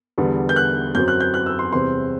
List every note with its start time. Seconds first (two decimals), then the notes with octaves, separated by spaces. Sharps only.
0.18 E2 D3 G3 B3
0.49 G6
0.56 F#6
0.95 F#2 F#3 C4 G6
1.08 F#6
1.20 G6
1.34 F#6
1.46 E6
1.59 C6
1.72 E2 C3 G3 C4 C6